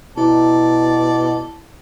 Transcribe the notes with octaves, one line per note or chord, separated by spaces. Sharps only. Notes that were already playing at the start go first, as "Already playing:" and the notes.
B2 E4 A4 D5